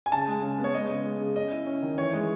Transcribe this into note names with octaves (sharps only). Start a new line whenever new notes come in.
G#5
C#3 A5
G#3
C#3
B3
C#5
G#3 D#5
C#3
G#3
C#3
C#4 D#5
E4
C#4
D#3
E3 C#5
G#3